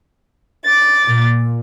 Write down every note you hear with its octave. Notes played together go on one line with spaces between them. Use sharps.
D6 A6
A#2